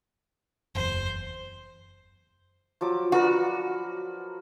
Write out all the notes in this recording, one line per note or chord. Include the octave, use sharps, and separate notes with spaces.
F#1 E2 C5
F3 F#3 D6
F#4 A#4 B4 D5